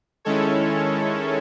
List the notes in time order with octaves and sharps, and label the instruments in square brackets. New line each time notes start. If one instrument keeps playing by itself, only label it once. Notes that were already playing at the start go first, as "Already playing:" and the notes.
[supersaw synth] D#3 G#3 C#4 E4 A4 C#5